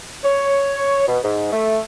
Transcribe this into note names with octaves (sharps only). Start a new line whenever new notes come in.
C#5
B2
G#2
A3